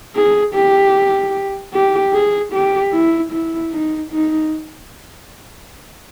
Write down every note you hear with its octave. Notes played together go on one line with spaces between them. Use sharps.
G#4
G4
G4
G#4
G4
E4
E4
D#4
D#4